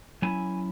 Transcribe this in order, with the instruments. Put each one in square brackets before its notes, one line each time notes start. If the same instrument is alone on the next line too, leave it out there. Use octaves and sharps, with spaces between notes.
[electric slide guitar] F#3 C#4 E4 G#5